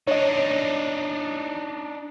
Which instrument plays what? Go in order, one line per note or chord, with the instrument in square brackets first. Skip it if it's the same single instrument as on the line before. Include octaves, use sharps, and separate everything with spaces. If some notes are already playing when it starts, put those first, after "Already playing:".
[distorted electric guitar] D4 D#4 [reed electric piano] C#5 D#5